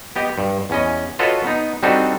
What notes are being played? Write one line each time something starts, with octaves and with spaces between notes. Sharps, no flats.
B3 G4 D#5
G2
E2 C#4 D#5
F4 F#4 A4 B4 C#5 D#5
B3 D#4
G3 C4 D4 D#4 F#4 A4